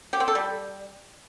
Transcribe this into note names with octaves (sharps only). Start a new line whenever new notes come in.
G4
C4
A4
G3